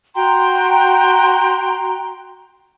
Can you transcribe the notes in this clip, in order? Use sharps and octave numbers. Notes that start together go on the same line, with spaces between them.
F#4 G5 A#5 C6